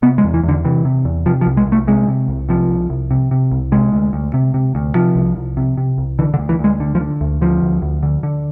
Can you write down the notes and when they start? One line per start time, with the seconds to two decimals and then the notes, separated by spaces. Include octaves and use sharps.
0.02 C3 B3
0.18 G#3
0.24 E2
0.34 E3
0.43 E2 D3
0.64 C3 E3
0.85 C3
1.05 E2
1.26 C3 F3
1.41 F3
1.47 C2
1.57 G#3
1.67 C2
1.72 A3
1.87 C3 G#3
2.08 C3
2.28 C2
2.49 C3 F3
2.69 C2
2.90 C2
3.11 C3
3.31 C3
3.51 C2
3.72 C3 G#3
3.92 D2
4.13 D2
4.34 C3
4.54 C3
4.75 D2
4.95 C3 F3
5.16 C2
5.37 C2
5.57 C3
5.77 C3
5.98 C2
6.19 D3 E3
6.34 D3
6.38 D2
6.49 E3
6.59 D2 G#3
6.80 D3
6.95 F3
7.01 D3
7.21 D2
7.41 D3 F3
7.62 D2
7.82 D2
8.03 D3
8.23 D3